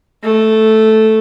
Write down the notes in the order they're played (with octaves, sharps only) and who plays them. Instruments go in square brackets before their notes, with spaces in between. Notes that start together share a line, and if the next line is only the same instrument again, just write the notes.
[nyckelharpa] A3